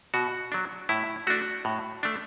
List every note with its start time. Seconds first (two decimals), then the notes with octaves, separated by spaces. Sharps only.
0.14 B2 F#4
0.52 F#3 D4
0.89 A2 E4
1.27 A3 D4 F#4
1.65 A2
2.03 A3 D4